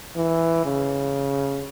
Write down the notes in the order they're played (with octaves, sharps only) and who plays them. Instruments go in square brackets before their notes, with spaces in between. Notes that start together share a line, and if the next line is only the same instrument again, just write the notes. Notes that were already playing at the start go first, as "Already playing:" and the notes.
[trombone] E3
C#3